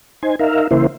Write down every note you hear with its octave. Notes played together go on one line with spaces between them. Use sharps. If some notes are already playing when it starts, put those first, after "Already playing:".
D#4 C5 G#5
D#4 A#4 E5 F5
C#3 E3 A#3 E4 C5